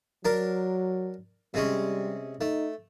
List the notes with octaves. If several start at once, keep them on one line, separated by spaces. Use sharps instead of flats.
F#3 D4 A#4
C3 G3 G#3 C#4
A3 D#4